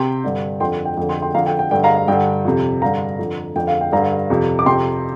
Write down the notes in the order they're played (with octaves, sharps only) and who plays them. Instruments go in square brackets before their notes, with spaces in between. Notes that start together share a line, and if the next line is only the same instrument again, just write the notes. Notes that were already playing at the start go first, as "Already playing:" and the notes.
Already playing: [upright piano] C3 G5 C6
G2 D3
F2 D3 G5 C6
G5
F2 D3 G5
G5 C6
G5 C6
F2 D3 F5 A#5
G5
G5
G2 D3 G5
F5 A#5
F5
G2 D3 G5
F2 C3
G2 D3 F5 A#5
F2 D3
F2 G5
D3
F5
G5
G2 D3 F5 A#5
F2 C3
D6
F2 C3 G5 C6